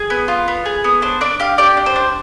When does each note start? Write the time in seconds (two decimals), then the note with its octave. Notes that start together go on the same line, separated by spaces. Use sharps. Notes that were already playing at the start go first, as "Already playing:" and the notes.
Already playing: G#4
0.10 B3
0.28 F4
0.48 B3
0.66 G#4
0.84 B3
1.02 D4 C5
1.21 D4 D5
1.40 G4 F5
1.58 G4 D5
1.77 D4
1.86 C5
1.96 D4